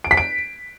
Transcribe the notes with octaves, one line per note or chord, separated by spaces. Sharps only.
D7
B6
D7